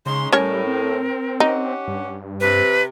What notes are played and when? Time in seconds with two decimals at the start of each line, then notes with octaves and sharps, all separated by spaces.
0.06 C#3 G#3 C#4 D#4 C6
0.33 A2 G3 C#4 A#4 C#5
0.67 C4
1.40 C#4 D#4 G4 F#5
1.87 G2
2.41 C3 B4